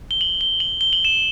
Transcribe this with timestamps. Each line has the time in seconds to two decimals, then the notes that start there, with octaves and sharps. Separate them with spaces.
0.11 G7
0.21 F#7
0.41 G7
0.60 F#7
0.81 G7
0.93 F#7
1.05 E7